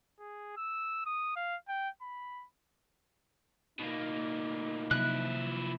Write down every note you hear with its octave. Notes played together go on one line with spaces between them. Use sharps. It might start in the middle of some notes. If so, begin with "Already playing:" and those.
G#4
E6
D#6
F5
G5
B5
B2 A#3 D#4
C3 F3 F#3 A#3 E4 F#6